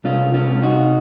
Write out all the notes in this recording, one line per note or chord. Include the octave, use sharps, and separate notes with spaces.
C2 C#4 F4
C#4 F4
C3
D#4 F#4